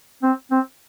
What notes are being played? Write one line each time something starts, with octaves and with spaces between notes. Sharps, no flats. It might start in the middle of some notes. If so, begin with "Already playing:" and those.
C4
C4